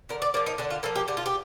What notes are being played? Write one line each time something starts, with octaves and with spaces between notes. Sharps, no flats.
D3 A#4
D5
F3 A#3 D5
D#4
D3 D4
F4
F3 A#3 A4
G4
D3 G4
F4
G4